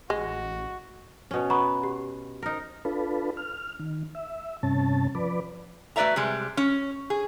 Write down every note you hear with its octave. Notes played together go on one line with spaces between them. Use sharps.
A1 G#3 F#4
B2 C#4
B3 A#5 B5 C#6
G4
D#4 A#4
D4 F4 A4 B4
F6
D#3
E5
G2 C3 C#4 A5
F3 B4 D5
A3 F#4 B4 D5 E5 A#5
C3 G3 G#3
C#4
G#4